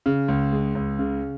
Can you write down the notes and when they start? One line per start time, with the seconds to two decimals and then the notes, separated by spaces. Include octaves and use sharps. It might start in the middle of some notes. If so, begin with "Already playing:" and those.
0.06 C#3
0.28 C#2
0.52 G#3
0.75 C#2
0.99 C#3